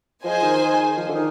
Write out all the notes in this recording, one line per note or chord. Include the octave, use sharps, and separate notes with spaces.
F3 G#4 C5 D#5 G#5
D#3
F3
D3
D#3